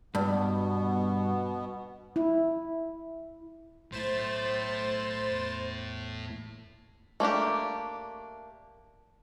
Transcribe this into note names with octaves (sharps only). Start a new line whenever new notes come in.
G2 B2 B3
E4
B1 A2 E4 C5 A6 E7
E2
A3 A#3 D4 G4